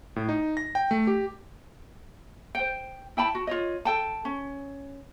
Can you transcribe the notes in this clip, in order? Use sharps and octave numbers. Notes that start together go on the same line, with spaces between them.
A2
D#4
A#6
G5
A3
G4
C5 G5
E4 G5 A5 B5
F#4
F4 C#5 D#5
A4 G5 A5
C#4